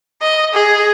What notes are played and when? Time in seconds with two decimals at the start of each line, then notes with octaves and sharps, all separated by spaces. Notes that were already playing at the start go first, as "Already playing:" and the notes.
0.22 D#5
0.54 G#4